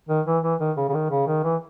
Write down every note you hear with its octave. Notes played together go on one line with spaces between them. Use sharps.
D#3
E3
E3
D#3
C#3
C#3
D#3
C#3
D#3
E3